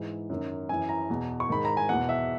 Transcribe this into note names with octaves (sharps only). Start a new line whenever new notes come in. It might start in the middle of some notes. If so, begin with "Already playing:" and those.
Already playing: G#2 E3
F#2 D#3
F#2 E3 G#5
A#5
E2 B2
C#6
G#2 D#3 B5
A#5
G#5
E2 B2 F#5
E5